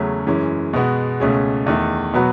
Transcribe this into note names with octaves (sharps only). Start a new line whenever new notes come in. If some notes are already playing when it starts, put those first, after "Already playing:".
Already playing: E2 C#3 F#3 A3 C#4
F#2 E3 G#3 C#4
B2 G#3 B3 F#4
C#2 B2 A3 C#4 G#4
E2 D#3 A3
B2 F#3 B3 F#4 B4